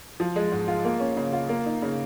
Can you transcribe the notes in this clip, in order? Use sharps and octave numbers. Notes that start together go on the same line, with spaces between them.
F3
G#3
G#2
F4
A#3
C#4
C#3
F4
A#3
D#4
C#3